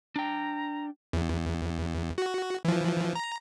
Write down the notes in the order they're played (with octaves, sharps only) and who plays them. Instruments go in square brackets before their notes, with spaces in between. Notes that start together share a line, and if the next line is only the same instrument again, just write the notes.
[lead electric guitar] D4 G5 [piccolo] A#5
[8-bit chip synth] E2
F#4
E3 F3
A#5